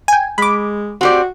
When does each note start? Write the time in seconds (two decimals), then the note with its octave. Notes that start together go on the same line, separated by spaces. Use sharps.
0.08 G5 G#5
0.38 G#3 B5 D6
1.01 C4 F#4 G4 D5